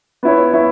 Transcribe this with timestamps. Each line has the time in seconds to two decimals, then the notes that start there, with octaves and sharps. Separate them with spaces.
0.23 B3 E4 C#5
0.53 B3 E4 C#5